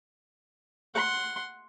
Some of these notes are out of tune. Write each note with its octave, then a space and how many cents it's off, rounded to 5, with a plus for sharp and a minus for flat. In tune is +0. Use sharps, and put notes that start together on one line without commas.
F#5 +0 C6 +5